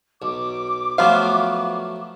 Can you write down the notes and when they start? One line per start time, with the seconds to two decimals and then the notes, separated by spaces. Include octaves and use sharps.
0.22 B1 D6
0.98 F3 F#3 A3 B3 F4 F5